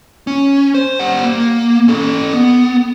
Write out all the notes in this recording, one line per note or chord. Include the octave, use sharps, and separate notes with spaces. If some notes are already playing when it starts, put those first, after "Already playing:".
C#4
C5
G3 F#5
A#3
C#4 A4
B3